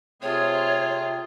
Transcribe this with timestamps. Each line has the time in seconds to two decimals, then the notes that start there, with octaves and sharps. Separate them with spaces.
0.22 C3 A3 C4 F4 G#4 C#5